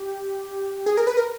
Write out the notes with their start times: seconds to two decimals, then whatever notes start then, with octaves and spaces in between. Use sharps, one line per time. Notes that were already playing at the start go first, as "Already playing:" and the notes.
Already playing: G4
0.86 G#4
0.97 A#4
1.07 B4
1.17 A#4